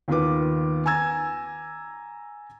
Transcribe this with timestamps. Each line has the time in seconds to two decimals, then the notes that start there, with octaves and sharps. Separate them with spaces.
0.08 D#2 D#3 B3 F4 B4 D6
0.86 G#5 A#5 E6 G#6 A6